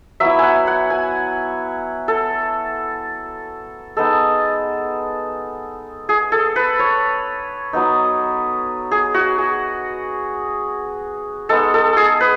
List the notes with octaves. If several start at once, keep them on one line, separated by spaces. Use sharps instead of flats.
F#3 B3 E4 E5
F#5 G#5
F#5
G#5
A4
G#3 B3 D#4 A4
G#4
A4
B4
C#5
F#3 B3 D#4
G#4
F#4
G#4
G#3 B3 D#4 A4
A4
G#4
B4